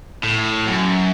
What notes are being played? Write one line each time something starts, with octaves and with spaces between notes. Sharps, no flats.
A2
F#2